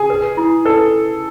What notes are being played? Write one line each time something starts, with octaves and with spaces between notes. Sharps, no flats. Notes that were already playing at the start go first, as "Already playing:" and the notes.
Already playing: G#4
B4
E4
A4 B4